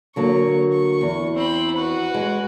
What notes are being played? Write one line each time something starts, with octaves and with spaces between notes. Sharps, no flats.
D3 F#3 A#3 C#6
C#6
E2
C4 B5
F#4 B4
G#3